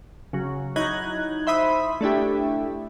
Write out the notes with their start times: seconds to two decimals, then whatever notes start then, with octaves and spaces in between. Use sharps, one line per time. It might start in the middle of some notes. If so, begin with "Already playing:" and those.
0.33 C#3 F#3
0.76 F#3 D#4 E4 F#6 G#6
1.47 C5 E5 B5 D#6
2.01 A3 D4 E4 G4